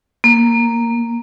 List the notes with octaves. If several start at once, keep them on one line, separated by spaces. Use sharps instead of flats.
A#3